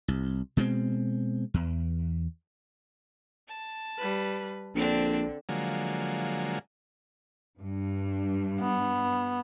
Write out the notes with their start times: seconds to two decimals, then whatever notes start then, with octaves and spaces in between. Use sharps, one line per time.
0.08 C2
0.57 B2 G#3 C4
1.54 E2
3.48 A5
3.98 G3 B4
4.75 A#1 D3 C4 D4
5.49 D3 F3 F#3 G#3 A#3
7.60 G2
8.59 B3